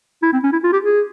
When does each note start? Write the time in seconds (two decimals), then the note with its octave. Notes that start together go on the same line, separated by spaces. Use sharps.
0.23 E4
0.33 C4
0.43 C#4
0.52 E4
0.64 F4
0.73 G4
0.83 G#4